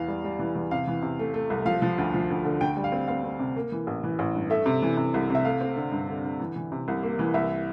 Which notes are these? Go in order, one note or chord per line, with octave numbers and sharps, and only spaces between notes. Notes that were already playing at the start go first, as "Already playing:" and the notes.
Already playing: E2 E3 F5
G3
G3
E3
E2
C3 F5
E3
C3
A3
A3
C2
F3 F5
F3
D2
F3
D2
D3
D2 G5
G3
F5
C4
C4 F5
C4
C3
A#3
E3
A1
E3
A1
G2
A3 E5
C3
E3
C3
C2
C3 E5
A3 F5
C4
D3
G2
D3
D3
E3
E3
C3
C2
A#3
E3
C2 E5